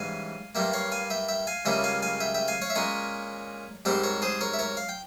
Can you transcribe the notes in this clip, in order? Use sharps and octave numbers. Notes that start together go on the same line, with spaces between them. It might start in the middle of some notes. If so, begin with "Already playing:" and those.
Already playing: G#2 E3 G3 C#4 F5 G#5
G2 G3 A#3 E5 G5
C#5 F5
F5 G#5
E5 G5
E5 G5
F5 G#5
C#2 C#3 G3 A#3 C#4 E5 G5
F5 G#5
F5 G#5
E5 G5
E5 G5
F5 G#5
C#5 F5
E5
A#2 G#3 C#4 A#4 C#5
G#2 G3 C4 G4 A#4
A#4 C#5
G#4 C5
A#4 C#5
E5
A#4 C#5
F5
G5